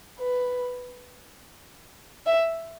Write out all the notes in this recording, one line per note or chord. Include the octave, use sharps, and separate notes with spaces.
B4
E5